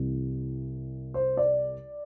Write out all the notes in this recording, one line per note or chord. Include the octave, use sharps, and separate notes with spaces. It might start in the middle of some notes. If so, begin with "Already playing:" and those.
Already playing: C2 C3 E3 G3
C5
D5